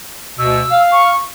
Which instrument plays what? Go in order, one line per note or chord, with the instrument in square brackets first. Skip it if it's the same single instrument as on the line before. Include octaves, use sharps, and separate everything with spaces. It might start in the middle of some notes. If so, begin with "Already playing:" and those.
[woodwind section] D2 B2 [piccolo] E6
[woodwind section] F5
[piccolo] C#6